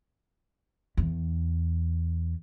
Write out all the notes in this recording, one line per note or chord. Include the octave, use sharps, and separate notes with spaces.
E2